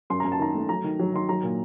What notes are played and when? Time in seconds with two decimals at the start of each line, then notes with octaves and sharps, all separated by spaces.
0.10 F#2 C6
0.20 F#2 A#5
0.32 A5
0.39 D#3 A#5
0.55 A3
0.69 F#3 A#5
0.84 D#3
0.99 F#3
1.14 D#3 C6
1.29 F#3 A#5
1.43 A#2